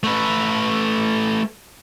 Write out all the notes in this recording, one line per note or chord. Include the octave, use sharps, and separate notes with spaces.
A3 B4